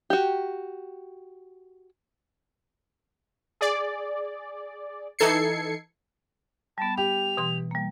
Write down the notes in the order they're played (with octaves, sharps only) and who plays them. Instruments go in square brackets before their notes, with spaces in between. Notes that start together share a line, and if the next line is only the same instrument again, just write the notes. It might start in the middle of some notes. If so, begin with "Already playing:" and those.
[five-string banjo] F#4 G4
[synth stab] G#4 D5
E3 D#4 A4 G#6 C7 C#7
[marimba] G3 B3 [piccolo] A5
[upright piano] G4 [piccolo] F7
[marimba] B2 E3 C6
G3 A#3